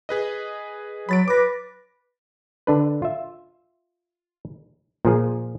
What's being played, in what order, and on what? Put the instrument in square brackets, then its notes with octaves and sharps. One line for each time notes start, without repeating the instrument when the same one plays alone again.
[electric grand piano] G#4 B4 D#5
[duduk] F#3 [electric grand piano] B5 A6 D7
[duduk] B4 [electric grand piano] D6 A#6
[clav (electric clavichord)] D3 D4 B4
F4 E5
A#2 F3 G#4